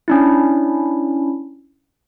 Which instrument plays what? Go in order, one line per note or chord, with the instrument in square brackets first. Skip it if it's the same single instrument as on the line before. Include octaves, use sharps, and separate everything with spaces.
[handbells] C#4 D4 E4